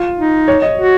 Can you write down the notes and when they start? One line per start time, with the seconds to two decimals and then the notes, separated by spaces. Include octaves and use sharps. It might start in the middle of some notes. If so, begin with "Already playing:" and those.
Already playing: F4
0.18 D#4
0.48 C#5
0.62 D#5
0.78 F#4